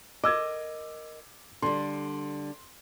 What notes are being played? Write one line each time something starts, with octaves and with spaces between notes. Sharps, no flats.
A#4 D#5 D6 E6 G#6
D3 G3 C6